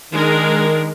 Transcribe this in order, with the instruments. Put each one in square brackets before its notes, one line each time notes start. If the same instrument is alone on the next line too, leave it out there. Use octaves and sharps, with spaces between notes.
[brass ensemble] D#3 [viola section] G#3 D4 A#4